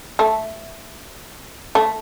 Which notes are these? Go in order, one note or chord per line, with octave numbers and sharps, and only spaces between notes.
A3
A3